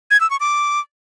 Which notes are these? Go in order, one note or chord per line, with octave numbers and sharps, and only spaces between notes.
G#6
E6
C#6
D6